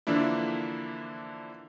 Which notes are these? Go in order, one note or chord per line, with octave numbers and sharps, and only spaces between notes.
D3 E3 F3 A#3 D4 E4